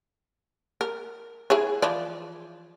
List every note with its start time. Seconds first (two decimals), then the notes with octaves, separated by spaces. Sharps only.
0.81 A#4
1.50 E4 G#4 C#5
1.82 E3 F3 D5